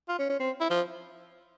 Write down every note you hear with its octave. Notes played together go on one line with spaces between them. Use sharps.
F4
C#4
C#4
C4
E4
F3